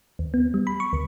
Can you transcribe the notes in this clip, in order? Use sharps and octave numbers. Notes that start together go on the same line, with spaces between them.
D#2
B3
G3
B5
C#6
D2